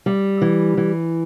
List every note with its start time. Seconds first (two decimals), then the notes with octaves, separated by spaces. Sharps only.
0.06 G3
0.41 E3
0.77 E3